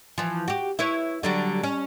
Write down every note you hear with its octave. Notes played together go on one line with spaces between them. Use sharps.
E3 F3
F#4 G4
E4 B4 C#5
D3 F#3 G3
C#4